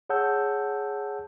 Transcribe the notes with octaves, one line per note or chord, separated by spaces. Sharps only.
G#4 C#5 F#5 A5 E6 G6